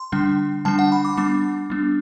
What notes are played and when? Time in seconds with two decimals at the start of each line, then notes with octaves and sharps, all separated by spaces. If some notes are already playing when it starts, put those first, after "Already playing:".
Already playing: C6
0.12 D3 G3 D4
0.65 D3 G3 D4 A5
0.79 F#5
0.92 B5
1.05 D6
1.17 G3 B3 D4 D6
1.70 G3 B3 D4